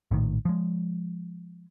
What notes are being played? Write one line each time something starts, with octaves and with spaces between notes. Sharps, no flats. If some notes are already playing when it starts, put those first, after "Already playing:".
A#1 A2 D#3
F3 G#3